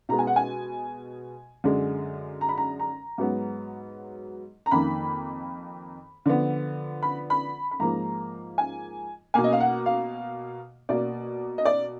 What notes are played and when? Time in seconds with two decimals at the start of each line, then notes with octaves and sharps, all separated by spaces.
0.09 B2 G#3 B3 A#5
0.19 G#5
0.27 F#5
0.36 G#5
1.64 F#2 D3 G#3
2.41 A#5
2.49 B5
2.58 A#5
2.79 A#5
3.18 G#2 F#3 B3
4.66 A#5
4.71 F2 D#3 A#3 B5
6.26 D3 F3 B3
7.03 B5
7.30 B5
7.71 B5
7.80 G#2 F3 A#3 A#5
8.58 G#5
9.34 B2 A#3 G#5
9.44 D#5
9.52 F5
9.60 F#5
9.86 F5
10.89 B2 A#3 D5
11.58 D#5
11.65 D5